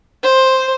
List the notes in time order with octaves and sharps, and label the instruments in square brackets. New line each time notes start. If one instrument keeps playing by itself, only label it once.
[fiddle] C5